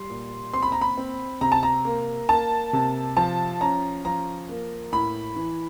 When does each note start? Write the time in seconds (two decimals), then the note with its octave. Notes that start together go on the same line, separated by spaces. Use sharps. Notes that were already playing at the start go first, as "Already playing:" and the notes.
Already playing: G3 C6
0.10 A#2
0.53 C4 C6
0.62 B5
0.72 A#5
0.81 B5
0.97 C4
1.41 C3 A#5
1.52 A5
1.63 A#5
1.85 A#3
2.29 A#3 A5
2.73 C3
3.17 F3 A5
3.61 C#4 A#5
4.05 F3 A#5
4.49 A#3
4.92 A2 B5
5.36 E3